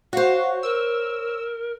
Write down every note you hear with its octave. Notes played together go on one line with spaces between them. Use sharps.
F#4 C5 C#5 F5
A#4 E6